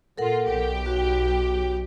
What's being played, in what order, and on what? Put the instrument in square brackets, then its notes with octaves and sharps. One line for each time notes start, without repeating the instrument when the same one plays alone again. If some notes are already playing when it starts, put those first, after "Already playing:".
[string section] A#2 F4 [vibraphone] A4 A#4 F#5
[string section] B1 G4 G5
[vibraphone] F#4